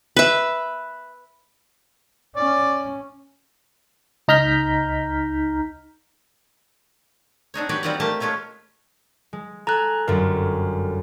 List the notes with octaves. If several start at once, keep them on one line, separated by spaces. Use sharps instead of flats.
B4 E5
C#4 D5
C#2 D#4 A#5 F6 G6 B6
C4 D4 D#4 C#5
F#4 G4 B4 C#5 D5
G3 C4 D#4 F4 D5 F#5
A3 A#3 G4 A5
G#3 A3 C#4 F4 E5
G#3
A4 G#5 A#5 F#6
G1 F#2 A#4